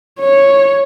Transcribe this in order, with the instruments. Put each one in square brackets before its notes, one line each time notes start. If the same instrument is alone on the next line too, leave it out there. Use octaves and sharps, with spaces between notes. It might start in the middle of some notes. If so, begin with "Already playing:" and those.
[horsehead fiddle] C#5